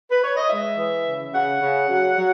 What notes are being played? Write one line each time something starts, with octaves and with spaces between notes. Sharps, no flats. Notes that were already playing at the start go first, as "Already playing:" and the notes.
B4
C#5
D#5
G#3 E5
E3
C#3
C#3 F#5
C#3
F#3
F#3